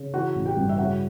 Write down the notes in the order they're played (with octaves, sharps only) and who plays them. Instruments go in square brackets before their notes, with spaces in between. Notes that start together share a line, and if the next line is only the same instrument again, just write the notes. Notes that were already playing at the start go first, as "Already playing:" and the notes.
Already playing: [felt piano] C#3
E3 F#4 F#5
A1
G4 G5
G2
E5
C#3 F#4 F#5